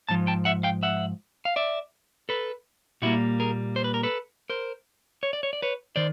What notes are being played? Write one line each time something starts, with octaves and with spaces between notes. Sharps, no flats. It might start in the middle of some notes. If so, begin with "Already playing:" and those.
G#2 F3 A5
G5 A5
E5 F#5
F5 G5
E5 F#5
F5
D5 E5
A4 B4
A#2 G3 A#3 E4 F#4
G#4 A#4
C5
B4
A#4
A4 B4
A#4 C5
C#5
D5
C#5
D5
B4 C#5
D#3 C5 D5